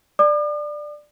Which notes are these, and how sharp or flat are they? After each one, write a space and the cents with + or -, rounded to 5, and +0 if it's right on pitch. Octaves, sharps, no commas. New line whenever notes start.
D5 +10 D6 +45